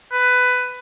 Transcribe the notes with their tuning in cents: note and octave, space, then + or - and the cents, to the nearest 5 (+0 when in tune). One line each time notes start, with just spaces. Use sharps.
B4 +15